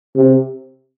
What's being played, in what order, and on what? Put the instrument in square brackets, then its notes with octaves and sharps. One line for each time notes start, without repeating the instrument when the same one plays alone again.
[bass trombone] C3